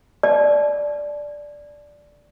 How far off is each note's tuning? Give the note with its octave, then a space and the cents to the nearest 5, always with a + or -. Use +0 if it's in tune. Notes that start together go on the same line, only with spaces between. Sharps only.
D5 +0 A5 -35